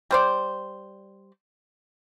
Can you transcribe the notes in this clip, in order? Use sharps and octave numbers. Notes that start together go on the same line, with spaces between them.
G3 C5 D5